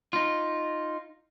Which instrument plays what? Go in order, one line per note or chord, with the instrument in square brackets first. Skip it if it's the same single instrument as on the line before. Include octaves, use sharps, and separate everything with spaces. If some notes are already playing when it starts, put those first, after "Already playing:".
[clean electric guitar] D#4 F4